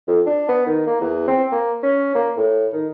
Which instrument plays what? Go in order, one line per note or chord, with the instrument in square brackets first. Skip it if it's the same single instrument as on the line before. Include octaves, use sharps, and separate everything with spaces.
[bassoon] F2
D4
B3
D#3
A#3
E2
C4
A#3
C#4
A#3
A2
D#3